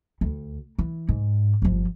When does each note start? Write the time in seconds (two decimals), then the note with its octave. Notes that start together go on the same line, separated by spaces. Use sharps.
0.21 D2
0.79 E3
1.09 G#2
1.62 G1 F3